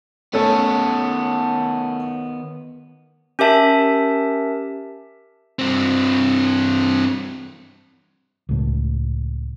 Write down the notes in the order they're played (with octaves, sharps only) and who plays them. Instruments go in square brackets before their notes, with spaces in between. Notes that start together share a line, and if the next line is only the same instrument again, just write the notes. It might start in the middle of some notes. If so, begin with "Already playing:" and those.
[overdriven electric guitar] D#3 B3 [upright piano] A3 C#4 A4
[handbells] C#4 G4 A#4 E5 A5
[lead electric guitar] G2 C4
[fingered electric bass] C#2 A2